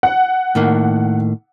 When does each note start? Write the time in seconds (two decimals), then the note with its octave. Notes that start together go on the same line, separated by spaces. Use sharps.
0.03 F#5
0.55 A2 D#3 A#3